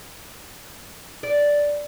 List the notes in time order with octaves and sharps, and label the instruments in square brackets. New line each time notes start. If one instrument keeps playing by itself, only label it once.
[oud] D5